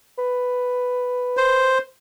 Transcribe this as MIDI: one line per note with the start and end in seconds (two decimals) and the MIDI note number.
0.19 1.84 71
1.37 1.78 72